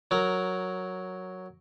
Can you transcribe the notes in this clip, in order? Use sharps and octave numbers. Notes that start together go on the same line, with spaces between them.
F#3 A#4